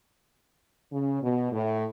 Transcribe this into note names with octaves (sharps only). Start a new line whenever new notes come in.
C#3
B2
A2